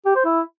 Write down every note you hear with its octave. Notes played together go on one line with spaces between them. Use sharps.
G4
C5
E4